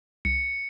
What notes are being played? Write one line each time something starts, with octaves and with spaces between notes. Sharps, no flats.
C2 C#7